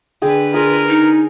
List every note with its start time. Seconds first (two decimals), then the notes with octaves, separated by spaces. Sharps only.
0.22 D3 G#4 B4 G5
0.54 F4 G#4 A#4
0.89 D#4